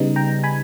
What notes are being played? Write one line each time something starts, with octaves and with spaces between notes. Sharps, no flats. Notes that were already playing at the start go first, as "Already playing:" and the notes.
Already playing: C#3 G3 B3 D#4
G5 A#5
G#5 B5